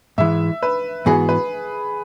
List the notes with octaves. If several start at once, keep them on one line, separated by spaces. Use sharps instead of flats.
G#2 E3 G#3 E5
B4
G#2 E3 B3 F#4 G#4
B4